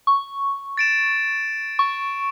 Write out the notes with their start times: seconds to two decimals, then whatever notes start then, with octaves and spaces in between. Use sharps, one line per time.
0.07 C#6
0.77 A6 D7 E7
1.79 C#6